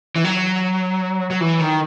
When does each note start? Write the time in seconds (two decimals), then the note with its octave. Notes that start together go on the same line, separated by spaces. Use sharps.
0.16 E3
0.24 F#3
1.31 F#3
1.41 E3
1.60 D#3